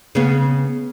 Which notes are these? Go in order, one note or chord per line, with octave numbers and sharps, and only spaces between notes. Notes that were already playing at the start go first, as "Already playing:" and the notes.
C#3 B3